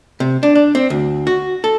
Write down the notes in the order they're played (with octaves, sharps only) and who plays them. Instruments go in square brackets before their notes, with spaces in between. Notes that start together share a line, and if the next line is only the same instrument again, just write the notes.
[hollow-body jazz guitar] C3
D4
D4
C4
D2
F#4
A4